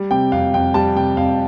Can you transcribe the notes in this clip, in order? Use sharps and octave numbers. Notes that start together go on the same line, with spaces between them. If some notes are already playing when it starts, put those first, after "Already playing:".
Already playing: G3
C3 G5
F2 F5
F2 G5
G3 A5
C3 G5
F2 F5